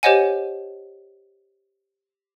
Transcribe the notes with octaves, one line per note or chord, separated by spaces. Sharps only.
G4 C5 C#5 D#5 F#5 G#5